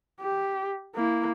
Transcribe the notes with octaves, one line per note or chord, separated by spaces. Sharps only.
G4
A#3 E4